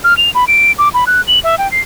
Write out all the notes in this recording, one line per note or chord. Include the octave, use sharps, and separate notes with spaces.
F6
F7
B5
D7
D6
B5
F#6
F#7
E5
G5
C7